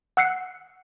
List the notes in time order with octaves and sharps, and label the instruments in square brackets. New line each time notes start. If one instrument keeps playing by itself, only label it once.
[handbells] F#5 E6 F#6 C7 C#7